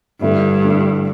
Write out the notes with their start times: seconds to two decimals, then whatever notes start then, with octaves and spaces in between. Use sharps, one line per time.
0.21 G2 D3 A3 E4
0.63 D3 A3 E4